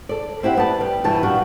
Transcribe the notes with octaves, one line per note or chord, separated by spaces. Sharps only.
A4 D5
C4 E4 G4 F#5
A3 B3 D5 A5
G3
G2 B2 E3 A5
A#2 G3 D4 F#4